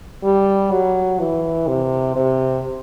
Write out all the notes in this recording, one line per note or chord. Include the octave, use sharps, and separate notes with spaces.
G3
F#3
E3
C3
C3